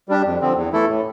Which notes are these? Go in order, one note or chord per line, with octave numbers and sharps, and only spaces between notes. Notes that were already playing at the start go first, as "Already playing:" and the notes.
G3 D4 G4
F2
D3 F3 C4
E2
E3 A3 E4 A4
A2